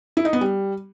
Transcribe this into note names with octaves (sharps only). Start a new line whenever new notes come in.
E4
D#4
B3
G3